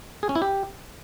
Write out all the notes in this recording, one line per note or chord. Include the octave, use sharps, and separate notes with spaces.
G#4
C#4
E4
G4